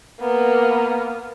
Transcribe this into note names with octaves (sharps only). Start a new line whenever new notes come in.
A#3 B3